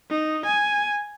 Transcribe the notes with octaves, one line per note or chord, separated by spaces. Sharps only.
D#4
G#5